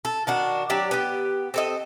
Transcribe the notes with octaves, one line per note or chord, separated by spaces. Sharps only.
A4
D#3 D4 F#4
F#3 D4 G4 D5
B3 G4
C4 A4 D#5